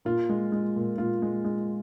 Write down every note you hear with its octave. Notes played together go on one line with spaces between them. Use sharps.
A#2 F4
G#3
G#3
A#2
A#2 F4
G#3
G#3